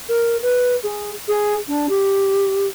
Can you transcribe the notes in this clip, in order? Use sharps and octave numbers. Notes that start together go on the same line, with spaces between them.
A#4
B4
G#4
G#4
D4
G4